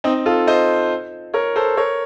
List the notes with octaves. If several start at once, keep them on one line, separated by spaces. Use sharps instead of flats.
C4 D#4
F4 A4
C5 D#5
A#4 C#5
A4 C5
A#4 C#5